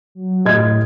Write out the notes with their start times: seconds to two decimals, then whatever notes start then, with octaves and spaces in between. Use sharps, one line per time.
0.15 F#3
0.45 A2 D#5 G#6